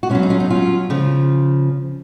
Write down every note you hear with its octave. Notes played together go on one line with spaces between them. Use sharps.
F#4
B2 C#4 F4
F#3
D#4
C#4 F4
D#4
C#4 F4
C#3 F3